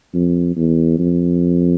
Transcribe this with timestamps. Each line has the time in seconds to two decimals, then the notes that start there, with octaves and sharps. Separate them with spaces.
0.14 F2
0.56 E2
0.99 F2